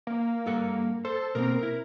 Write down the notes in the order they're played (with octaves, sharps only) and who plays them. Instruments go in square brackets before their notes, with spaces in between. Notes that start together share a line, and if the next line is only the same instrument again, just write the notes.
[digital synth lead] A#3
[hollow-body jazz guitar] G2 A4 F#5
[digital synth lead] A4 [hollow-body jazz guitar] C5
[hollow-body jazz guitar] B2 A#3 C4 [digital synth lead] A#4
[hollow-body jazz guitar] E4